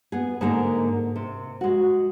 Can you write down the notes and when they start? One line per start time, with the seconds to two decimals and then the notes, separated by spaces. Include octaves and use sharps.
0.12 B3 G#4
0.41 G#2 D3 A#3 G#4 A#4
1.16 C3
1.61 G#3 F#4